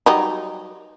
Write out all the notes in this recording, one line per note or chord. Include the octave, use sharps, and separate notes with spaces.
F#3 G3 D#4